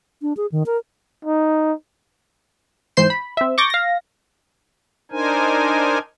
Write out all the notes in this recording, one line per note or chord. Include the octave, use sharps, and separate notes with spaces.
D4
G#4
D#3
A#4
D#4
G#2 E3 C5 G6 C7 E7
B5
C4 E5
C#6 D6 G6 A6 A#6
F5 A#6
D4 D#4 A#4 C5 G#5